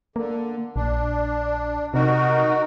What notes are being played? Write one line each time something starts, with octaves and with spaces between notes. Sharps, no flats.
D3 A#3
A#1 D4
C3 D#4 F#4 A#4